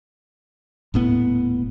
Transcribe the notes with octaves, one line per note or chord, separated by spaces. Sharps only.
D#1 A2 B3